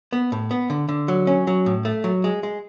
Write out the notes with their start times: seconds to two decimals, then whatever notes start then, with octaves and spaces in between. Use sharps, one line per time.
0.13 B3
0.32 A2
0.51 B3
0.70 D3
0.89 D3
1.08 F#3
1.27 C#4
1.47 F#3
1.66 A2
1.85 A3
2.04 F#3
2.24 G#3
2.43 G#3